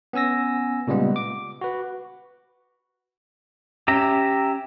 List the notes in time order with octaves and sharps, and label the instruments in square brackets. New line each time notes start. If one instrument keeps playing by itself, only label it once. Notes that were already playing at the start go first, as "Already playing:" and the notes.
[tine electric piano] B3 C#4 G#5 E6 A#6
A#2 C#3 G3 G#3 B3
D6
F#4 B4
[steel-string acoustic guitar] C#4 [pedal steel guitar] G4 E5 A#5